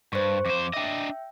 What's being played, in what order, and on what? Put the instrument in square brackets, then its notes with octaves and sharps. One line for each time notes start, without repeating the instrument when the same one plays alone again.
[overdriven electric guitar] G2 [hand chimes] C5 C#6
[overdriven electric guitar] F2 C5 [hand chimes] D6
[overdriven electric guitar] D4 D#5 [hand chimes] E5 G5